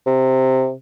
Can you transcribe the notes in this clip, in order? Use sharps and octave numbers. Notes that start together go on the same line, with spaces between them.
C3